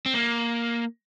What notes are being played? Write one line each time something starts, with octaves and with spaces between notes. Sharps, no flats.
C4
A#3